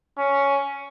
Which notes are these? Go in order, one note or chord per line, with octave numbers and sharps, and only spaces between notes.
C#4